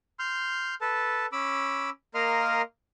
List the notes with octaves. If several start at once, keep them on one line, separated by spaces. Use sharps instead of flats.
C6 F6 G6
A4 B4 A5
C#4 B5 D6 E6
A#3 A#4 D#5 F5 C6 F6